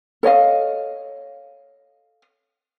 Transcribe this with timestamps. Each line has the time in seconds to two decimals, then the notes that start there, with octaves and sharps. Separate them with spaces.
0.23 A4 C#5 D#5 F5